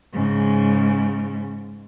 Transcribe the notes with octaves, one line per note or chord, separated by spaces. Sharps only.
G#2 C#3